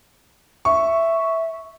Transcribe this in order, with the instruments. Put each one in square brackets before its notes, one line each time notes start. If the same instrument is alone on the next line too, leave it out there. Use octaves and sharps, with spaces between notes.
[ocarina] E5 [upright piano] C#6